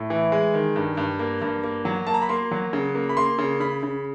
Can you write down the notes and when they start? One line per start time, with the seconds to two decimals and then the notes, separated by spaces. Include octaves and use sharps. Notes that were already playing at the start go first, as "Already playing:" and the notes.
Already playing: A2
0.10 E3
0.32 G#3
0.54 D#3
0.76 G2
0.97 G2
1.19 A#3
1.42 G2
1.64 A#3
1.85 F#3
2.07 A#3 A5
2.14 A#5
2.22 B5
2.29 A#3 C6
2.51 F#3
2.73 C#3
2.95 A#3
3.09 B5
3.17 A#3 C6
3.39 C#3
3.60 C#3 B5
3.83 C#3